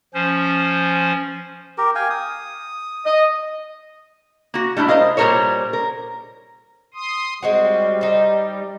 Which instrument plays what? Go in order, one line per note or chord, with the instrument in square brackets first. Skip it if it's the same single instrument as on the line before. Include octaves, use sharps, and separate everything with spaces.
[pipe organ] F3 C#4 C5
[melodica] G4 A#4
F5 G5 G#5
D#6
[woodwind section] D#5
[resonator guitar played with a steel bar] A#3 F#4
G3 A3 D4 E4
A#4 C5 D#5 F5
A#2 G3 F#4 A#4 C5 C#5
A#4
[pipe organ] C6 D#6
[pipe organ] G3 [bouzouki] G#3 C4 F#4
[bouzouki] D#4 C5